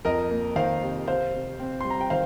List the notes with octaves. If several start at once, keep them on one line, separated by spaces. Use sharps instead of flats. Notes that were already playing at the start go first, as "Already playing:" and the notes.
F2 A#4 D#5
A#3
D#3 C5 F5
C3
C3 C5 F5
C3
C4
G3 C6
A#5
G5
D#3 C5 F5